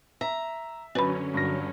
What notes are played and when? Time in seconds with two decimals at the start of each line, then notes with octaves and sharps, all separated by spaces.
0.21 E5 A#5
0.95 F#2 D3 F#3 C#4 B4 B5
1.34 G2 A#6